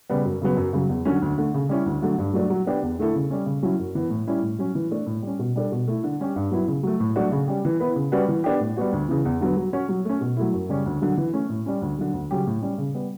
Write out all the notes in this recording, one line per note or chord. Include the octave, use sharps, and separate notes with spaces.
C#3 G3 B3
F#2
C#3 F#3 B3
F#2
C#3 F#3
E2
D3 F#3 C#4 F#4
D2
D3 A3
C#3
G3 C#4 E4
D2
D3 F#3 A3
G2
F#3 A3 D4
F#3
B3 D4 G4
E2
D3 A3 E4 A4
C#3
G3 C#4
C#3
F#3 C#4 E4
F#2
E3 B3
A2
G3 C#4 E4
A2
F#3 C#4
E3
A3 D4
A2
G3 C#4
B2
G3 D4 A4
B2
A3 E4
D3
G3 C#4 G4
G2
F#3 B3 E4
C#3
F#3 A3
A2
F#3 A3 D4 F#4
C#3
G3 C#4 G4
E3
B3 E4 B4
C#3
G3 C#4 F#4 B4
E3
B3 D4 G4
A2
G3 B3 F#4
D2
C#3 E3
E2
D3 F#3 B3
F#3
C#4 F#4 C#5
F#3
A3 C#4
B2
F#3 A3 E4
F#2
C#3 G3 C#4
D2
D3 F#3
E3
A3 C#4
A2
G3 C#4
D2
D3 F#3
D2
C#3 F#3 C#4 G4
A2
G3 C#4
C#3
G3 B3